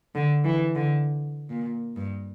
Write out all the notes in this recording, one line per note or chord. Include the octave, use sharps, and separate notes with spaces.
D3
E3
D3
A#2
G2